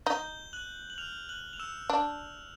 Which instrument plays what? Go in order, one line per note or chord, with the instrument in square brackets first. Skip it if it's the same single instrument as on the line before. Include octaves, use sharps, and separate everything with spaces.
[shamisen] D#4 [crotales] G6 G7
[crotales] F#6 F#7
F#7
F6 F7
F#6 F#7
F7
E6 E7
[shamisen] D4